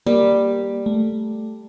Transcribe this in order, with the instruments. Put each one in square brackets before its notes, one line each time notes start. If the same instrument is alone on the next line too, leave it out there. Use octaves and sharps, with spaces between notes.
[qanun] G3 [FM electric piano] A#3
[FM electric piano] A3